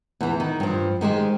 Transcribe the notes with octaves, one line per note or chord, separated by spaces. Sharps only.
E2 E3
D#3
G2 F3
D#3 G#3 G4 C5